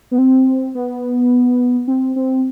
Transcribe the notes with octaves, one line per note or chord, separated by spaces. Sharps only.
B3
C4
B3
C4
C4